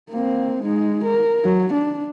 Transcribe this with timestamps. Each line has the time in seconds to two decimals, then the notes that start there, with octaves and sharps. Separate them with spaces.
0.10 A#3 C4
0.63 G#3 D#4
1.04 A#4
1.45 F#3
1.74 D4